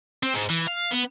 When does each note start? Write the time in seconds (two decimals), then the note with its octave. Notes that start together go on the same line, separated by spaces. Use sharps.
0.23 C4
0.34 G#2
0.50 E3
0.68 F5
0.92 B3